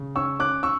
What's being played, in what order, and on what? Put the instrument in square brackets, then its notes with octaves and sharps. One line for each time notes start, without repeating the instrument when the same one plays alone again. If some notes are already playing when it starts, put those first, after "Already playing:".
Already playing: [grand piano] C#3
C#4 C#6 E6
C#4 D6 F#6
C#4 C#6 E6